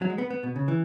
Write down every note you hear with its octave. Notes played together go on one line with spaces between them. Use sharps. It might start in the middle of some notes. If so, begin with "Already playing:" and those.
F#3
G#3
B3
B3
B2
C#3
E3